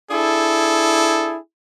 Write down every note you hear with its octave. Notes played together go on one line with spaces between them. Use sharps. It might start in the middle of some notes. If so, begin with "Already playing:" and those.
D4 E4 G#4 A4